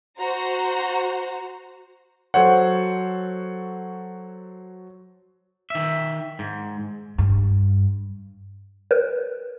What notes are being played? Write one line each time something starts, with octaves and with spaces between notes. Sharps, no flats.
F#4 C5 A#5
F#3 A4 C5 C#5 F#5
D#3 E5
G#2
G2
A#4 B4